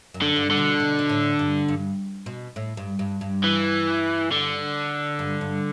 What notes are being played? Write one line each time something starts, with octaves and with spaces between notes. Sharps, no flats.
F#2
D3
G2
D3
B2
B2
B2
A2
G2
G2
B2
A2
G2
G2
G2
E3
D3
G2
G2